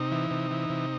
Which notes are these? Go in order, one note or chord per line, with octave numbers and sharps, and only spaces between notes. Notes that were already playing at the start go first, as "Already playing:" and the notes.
Already playing: C3 D#4
E3
C3
E3
C3